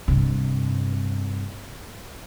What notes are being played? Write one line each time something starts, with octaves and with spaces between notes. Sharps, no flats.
G2 C3